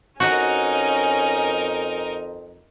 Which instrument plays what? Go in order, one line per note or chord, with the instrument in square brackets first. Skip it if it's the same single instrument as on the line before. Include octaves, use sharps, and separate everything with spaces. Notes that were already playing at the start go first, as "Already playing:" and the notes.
[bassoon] F2 [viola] C#4 G#5 [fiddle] D#4 A#4 [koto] F#4